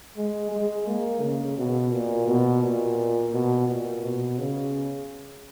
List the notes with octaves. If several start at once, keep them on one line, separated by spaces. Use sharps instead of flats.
G#3
G#3
A#3
C#3
B2
A#2
B2
A#2
B2
A#2
B2
C#3